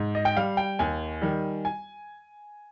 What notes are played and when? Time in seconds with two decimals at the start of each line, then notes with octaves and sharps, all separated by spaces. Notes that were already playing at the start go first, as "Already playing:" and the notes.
Already playing: G#2
0.15 D#5
0.25 G5
0.36 G3 F5
0.57 G5
0.79 D#2 G#5
1.22 D#3 G3
1.65 G#5